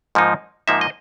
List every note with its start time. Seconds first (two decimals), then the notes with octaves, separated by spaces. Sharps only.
0.15 G#2 F3 A#3 D#4
0.68 G#2 F3 A#3 D#4 E5
0.81 D#5